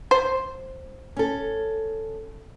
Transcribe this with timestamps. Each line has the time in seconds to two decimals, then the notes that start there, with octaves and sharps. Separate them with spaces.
0.11 C5
1.17 C#4 A4